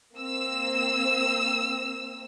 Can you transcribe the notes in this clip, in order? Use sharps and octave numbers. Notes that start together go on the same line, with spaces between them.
A#3 C4 E6